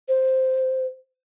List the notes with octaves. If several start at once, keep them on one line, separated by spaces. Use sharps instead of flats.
C5